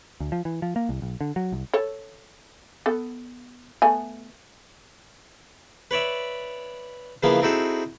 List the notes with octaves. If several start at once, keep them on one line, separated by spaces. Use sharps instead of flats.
D2
F3
E3
F3
A#3
C2
B1
D3
F#3
C2
A4 C#5
B3 A4
A3 B3 G#5
B4 C#5 D5 E5
C#3 E3 F3 A#3 B3 G#4
C4 D#4 E4 F#4 G#4 A4